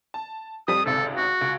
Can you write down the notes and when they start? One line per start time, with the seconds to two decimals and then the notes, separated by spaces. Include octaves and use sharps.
0.14 A5
0.68 F2 G3 D#6
0.86 G#1 C#2 C3 A4
1.16 F#4
1.41 C#2